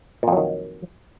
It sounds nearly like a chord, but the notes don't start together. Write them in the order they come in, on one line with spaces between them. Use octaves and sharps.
A#2 F2 F#3 D#3